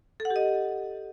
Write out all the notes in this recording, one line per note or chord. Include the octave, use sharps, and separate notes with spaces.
A4
F#5
G4
D#5